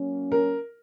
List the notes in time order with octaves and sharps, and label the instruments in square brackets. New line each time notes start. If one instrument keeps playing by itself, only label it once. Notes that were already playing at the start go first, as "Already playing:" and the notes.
Already playing: [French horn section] F#3 A#3 C#4
[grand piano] A#4